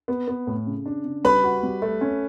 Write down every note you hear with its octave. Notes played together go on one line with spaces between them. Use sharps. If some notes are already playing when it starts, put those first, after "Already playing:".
B3
B3
A2
C#3
D4
C#3
G3 B4 B5
F#4
G3
A3
C#4